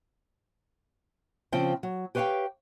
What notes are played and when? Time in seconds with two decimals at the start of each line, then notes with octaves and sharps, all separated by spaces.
1.53 C#3 F3 C4 G5
1.83 F#3
2.15 G4 B4 C#5 D#5 F5 G5